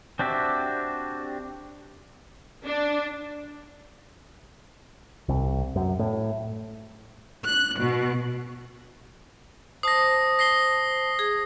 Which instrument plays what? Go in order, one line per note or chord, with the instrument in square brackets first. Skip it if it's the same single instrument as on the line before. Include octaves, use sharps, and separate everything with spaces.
[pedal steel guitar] C4 D4 F#4 G4 E5
[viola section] D4
[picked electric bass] C2
F#2
A2
[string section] F#6
B2
[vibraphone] C5 A5 [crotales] D#6 A#6
[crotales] A#6 C7 G7
[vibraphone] G#4